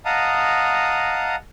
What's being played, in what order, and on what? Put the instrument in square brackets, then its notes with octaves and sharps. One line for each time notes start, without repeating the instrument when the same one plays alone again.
[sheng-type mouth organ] D#5 F5 F#5 A5 A#5 D#6